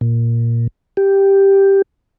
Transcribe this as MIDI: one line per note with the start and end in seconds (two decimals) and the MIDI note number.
0.01 0.67 46
0.97 1.82 67